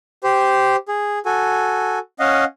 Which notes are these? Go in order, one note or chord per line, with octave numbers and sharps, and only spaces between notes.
G4 C5
G#4
F#4 A4 G#5
C#4 D#5 F5 F#5